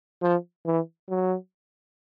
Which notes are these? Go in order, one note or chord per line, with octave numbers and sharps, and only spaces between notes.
F3
E3
F#3